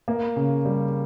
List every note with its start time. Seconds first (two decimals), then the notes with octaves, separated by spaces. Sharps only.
0.08 A#3
0.36 C#3
0.65 G3